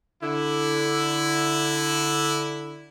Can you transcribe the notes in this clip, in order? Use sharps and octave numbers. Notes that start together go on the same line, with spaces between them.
D3 E4